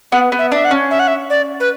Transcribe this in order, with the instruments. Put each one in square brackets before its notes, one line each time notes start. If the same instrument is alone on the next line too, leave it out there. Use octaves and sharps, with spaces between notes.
[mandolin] B3 [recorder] F#5
[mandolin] B3
[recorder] E5
[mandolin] D4 [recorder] E5
[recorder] F#5
[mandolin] C#4
[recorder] E5
F#5
E5
D5
B4